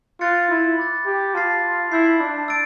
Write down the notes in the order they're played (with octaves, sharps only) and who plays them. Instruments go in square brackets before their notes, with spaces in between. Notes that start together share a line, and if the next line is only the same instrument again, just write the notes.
[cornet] F4 [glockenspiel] F#6 A6 C#7
[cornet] E4
[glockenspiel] B5 D6 F#6 A6
[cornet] G4
[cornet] F4 [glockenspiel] A5 C6 F6 A6 C7
[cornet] E4 [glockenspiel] E6 G6 C7
[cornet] D4
[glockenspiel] E6 A6 D7